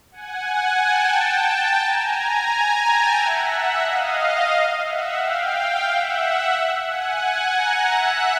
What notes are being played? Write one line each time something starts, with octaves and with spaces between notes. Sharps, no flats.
F#5 G#5
G5 A5
G#5 A#5
G#5 A#5
G5 A5
E5 F#5
D#5 F5
E5 F#5
F5 G5
F5 G5
E5 F#5
F#5 G#5
G#5 A#5
E5 F#5